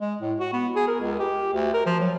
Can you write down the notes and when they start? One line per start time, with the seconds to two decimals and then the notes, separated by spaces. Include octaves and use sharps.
0.01 G#3
0.22 A2
0.39 F#4
0.53 B3
0.76 G#4
0.88 A#4
1.01 C#2
1.19 G4
1.53 D2
1.74 A#4
1.86 F3
2.00 F#3